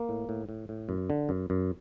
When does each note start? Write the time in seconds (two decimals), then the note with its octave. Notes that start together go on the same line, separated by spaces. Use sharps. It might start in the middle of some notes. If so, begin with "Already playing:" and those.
Already playing: A#3
0.09 A2
0.29 A2
0.49 A2
0.69 A2
0.89 F#2
1.10 D3
1.29 F#2
1.50 F#2